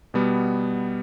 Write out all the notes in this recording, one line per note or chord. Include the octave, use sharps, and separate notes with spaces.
B2 G3 B3